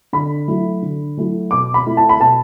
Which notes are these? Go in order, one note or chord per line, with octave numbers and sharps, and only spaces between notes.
D3 B5
F#3 A3 E4
D3
F#3 A3 E4
B2 D6
B5
A3 E4
A5
B5
B2 A5